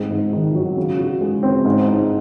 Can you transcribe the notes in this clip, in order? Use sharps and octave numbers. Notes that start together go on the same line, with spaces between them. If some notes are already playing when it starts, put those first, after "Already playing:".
Already playing: G#2 C4
G#2
D#3
F#3
C#3
F#4
G#3
C4
G#2
D#4